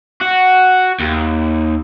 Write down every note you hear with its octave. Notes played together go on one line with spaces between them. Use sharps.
F#4
D#2